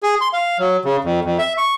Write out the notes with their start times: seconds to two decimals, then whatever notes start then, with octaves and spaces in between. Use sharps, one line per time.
0.03 G#4
0.21 C6
0.33 F5
0.59 F#3
0.85 C#3
1.04 F2
1.25 F2
1.38 E5
1.58 C#6